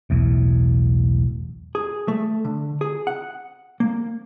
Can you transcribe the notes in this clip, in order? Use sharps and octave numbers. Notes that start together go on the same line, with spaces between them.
E1 B1 E2 A2
G#4
A3
D3
G#4
F#5
A#3